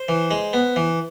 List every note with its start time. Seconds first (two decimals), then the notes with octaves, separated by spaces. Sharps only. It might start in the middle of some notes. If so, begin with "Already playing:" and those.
Already playing: C5
0.08 E3
0.31 G#3
0.53 B3
0.76 E3